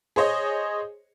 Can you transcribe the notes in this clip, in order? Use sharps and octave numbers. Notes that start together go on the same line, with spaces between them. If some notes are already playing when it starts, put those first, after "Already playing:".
G#4 C5 C#5 D#5